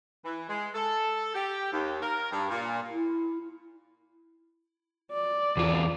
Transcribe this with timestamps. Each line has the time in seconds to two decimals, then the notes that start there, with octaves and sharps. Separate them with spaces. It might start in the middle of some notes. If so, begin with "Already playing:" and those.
0.24 E3
0.49 G#3
0.74 A4
1.35 G4
1.73 D#2
2.02 A#4
2.31 G2
2.51 A#2
2.91 E4
5.13 D5
5.57 E2 F4